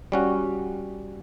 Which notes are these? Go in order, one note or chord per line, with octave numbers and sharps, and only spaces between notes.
G3 C#4 F#4